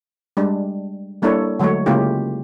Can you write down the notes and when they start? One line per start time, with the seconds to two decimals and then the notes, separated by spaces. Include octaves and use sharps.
0.37 G3 G#3 D4
1.22 G3 A#3 D4 E4 A4 C#5
1.59 D3 F#3 G#3 A3 C#5
1.86 C#3 G#3 A#3 E4 F4 G4